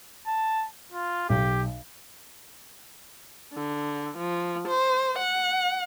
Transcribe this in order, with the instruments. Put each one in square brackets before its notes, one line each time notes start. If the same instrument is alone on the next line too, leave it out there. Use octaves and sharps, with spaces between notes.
[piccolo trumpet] A5
F4
[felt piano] B1 [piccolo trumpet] G4
[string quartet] D3
F3
C5
F#5